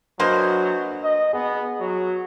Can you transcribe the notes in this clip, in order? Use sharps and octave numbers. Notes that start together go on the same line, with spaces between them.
E3 F#3 A#3 D4 B4 C5 D#5
D#5
B3 G#4
F#3